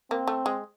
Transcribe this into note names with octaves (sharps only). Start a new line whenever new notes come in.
A#3 C4
A3
G#3